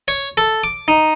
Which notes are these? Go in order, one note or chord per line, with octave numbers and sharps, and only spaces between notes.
C#5
A4
D6
D#4